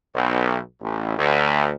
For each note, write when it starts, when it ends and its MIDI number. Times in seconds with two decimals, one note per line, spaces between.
0.14 0.57 35
0.81 1.18 33
1.18 1.72 38